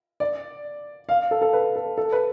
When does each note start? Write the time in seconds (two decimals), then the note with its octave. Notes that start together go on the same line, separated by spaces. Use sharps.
0.20 D5
1.09 F5
1.31 A4
1.42 A4
1.53 B4
1.76 A4
1.98 A4
2.12 B4